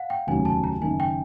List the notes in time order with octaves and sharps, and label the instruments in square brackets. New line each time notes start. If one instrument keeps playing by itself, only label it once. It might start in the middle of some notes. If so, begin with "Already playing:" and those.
Already playing: [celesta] F5 F#5
G5
[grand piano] F1 D#2 C#3 F#3 [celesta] G#5
[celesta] A5
A#5
[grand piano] F#1 F#2 D#3 [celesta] G#5
[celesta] G5